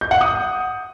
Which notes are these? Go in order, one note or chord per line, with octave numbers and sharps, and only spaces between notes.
G6
F#5
D#6